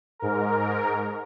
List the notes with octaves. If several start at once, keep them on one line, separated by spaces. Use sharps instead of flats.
G#2 A#4